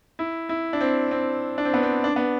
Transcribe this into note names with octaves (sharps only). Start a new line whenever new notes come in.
E4
E4
D4
C4
C4
D4
C4
B3
C4
D4
B3